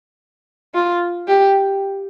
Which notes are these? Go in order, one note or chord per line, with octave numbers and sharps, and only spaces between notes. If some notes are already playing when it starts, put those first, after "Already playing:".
F4
G4